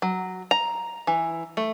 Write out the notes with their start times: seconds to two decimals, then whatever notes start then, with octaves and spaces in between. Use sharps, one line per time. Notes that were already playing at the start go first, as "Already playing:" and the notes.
0.02 F#3
0.51 A#5
1.07 E3
1.57 A3